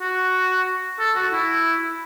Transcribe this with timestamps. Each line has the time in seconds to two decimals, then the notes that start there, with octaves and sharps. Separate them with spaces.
0.01 F#4
0.99 A4
1.16 F#4
1.32 E4